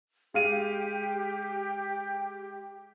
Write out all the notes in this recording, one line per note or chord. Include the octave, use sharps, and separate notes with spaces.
G#3 G4 F5 D#7